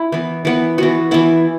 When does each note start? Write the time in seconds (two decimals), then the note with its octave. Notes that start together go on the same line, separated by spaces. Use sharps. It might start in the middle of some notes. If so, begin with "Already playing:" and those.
Already playing: E4
0.12 E3 B3
0.45 E3 B3
0.78 E3 B3 F#4
1.11 E3 B3 E4